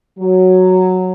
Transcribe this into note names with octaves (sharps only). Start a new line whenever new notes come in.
F#3